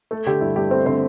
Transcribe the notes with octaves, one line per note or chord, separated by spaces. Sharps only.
A3 A4
D3 G4
G2 E4
G2 G4
A3 C4 C5
D3 C4 C5